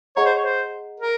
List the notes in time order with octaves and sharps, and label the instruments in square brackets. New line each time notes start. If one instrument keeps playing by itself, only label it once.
[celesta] G#4 D#5 F#5 A#5 [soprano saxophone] C#5
[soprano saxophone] C5
C#5
C5
A#4